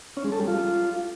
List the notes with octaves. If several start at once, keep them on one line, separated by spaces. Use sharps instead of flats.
C#4
G#3
A4
G3
F4